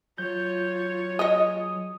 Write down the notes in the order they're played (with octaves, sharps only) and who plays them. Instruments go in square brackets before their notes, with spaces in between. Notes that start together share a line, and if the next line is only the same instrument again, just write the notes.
[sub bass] F#3 [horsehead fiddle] F4 C#5 [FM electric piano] G6
[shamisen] G#3 D#5 [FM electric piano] D#6